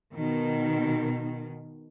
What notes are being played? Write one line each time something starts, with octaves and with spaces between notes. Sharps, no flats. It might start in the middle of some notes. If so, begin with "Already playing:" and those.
B2 D#3